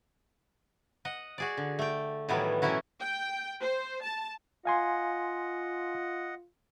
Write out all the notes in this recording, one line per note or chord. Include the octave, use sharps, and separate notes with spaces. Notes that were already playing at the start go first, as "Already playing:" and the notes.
D#5 F#5
F#4 G#4 D5
D3
A3 G5
A2 D#3 E3 F#3 G3 B3
B2 E3 F#3 C#4 E4 F#4
G5
C5
A5
F4 D#5 F5 F#5 G#5 C6